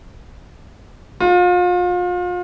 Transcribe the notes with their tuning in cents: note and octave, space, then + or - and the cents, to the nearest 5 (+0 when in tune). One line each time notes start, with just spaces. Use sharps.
F4 +35